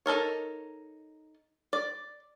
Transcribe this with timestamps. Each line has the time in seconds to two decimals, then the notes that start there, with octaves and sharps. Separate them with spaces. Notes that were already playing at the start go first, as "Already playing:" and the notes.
0.06 D#4 A4 A#4 C#5
1.73 D5